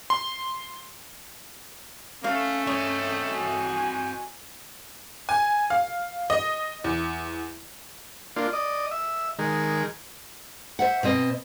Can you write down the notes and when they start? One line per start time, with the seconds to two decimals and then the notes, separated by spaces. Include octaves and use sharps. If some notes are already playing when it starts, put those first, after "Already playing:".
0.10 C6
2.24 A3 C#4 F5
2.67 C4 C#5 D#5
3.30 F#4 G#5
5.29 G#5
5.70 F5
6.30 D#5
6.84 E2
8.36 A#3 D4 F4 C6
8.53 D5 D#5
8.91 E5
9.39 D#3 G#3 A#4
10.79 C5 E5 F#5
11.03 B2 C4 D#5